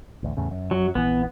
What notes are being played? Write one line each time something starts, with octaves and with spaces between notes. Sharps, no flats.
A1 D2
E2 A2 C#3
F#2
F#3
A#1 E3 B3